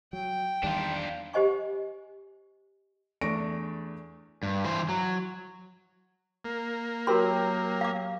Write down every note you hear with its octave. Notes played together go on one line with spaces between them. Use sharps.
F#3 G5
E2 D#3 G3 D4 F4
G4 C5 D#5 G#5 C#6
E2 A3 D4 C#6 A#6 D7
G2
E3 C5
F#3
A#3
F#3 F#4 G4 A#4 C6
F5 D6